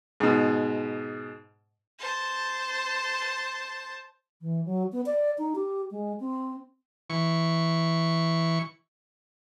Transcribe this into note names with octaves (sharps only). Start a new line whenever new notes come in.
G#2 B2
C5 A5
E3
F#3
B3
D5
D#4
G4
G#3
C4
E3 C#6